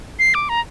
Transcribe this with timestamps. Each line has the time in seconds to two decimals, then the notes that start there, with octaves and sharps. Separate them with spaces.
0.19 C7
0.34 D6
0.49 A#5